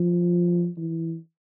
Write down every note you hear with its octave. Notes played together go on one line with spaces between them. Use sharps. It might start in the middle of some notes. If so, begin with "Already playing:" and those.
Already playing: F3
E3